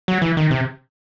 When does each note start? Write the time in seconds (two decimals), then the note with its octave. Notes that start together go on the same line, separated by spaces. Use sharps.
0.08 F#3
0.22 E3
0.37 D#3
0.51 C3